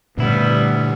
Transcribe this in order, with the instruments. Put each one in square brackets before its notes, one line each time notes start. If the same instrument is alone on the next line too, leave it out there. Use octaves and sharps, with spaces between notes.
[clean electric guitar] D2 E4 [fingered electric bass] G2 A#2 D4 [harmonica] G3 B3